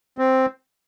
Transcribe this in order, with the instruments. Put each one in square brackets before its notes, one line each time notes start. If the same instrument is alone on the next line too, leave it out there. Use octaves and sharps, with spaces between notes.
[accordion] C4